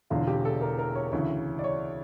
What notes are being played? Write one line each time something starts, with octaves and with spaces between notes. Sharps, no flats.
E1 E2 D3 F4
G4
A4
A#4
A#4
C#5
D2 C#3 E3 C#5
D5
C#5